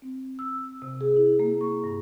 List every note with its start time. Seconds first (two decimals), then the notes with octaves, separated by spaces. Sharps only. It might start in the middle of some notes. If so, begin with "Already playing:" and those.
0.02 C4
0.39 E6
0.82 C3
1.01 G#4
1.16 E4
1.40 A#3
1.61 C#6
1.84 G2